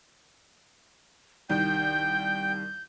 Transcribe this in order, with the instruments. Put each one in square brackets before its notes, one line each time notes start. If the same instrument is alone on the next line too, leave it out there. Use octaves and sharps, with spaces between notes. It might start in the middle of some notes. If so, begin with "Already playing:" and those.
[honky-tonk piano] C2 D#3 G3 [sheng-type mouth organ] G5 [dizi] G6